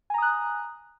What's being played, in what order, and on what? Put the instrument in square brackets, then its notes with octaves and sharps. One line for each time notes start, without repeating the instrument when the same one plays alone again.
[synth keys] G#5
A#5
D#6
F#6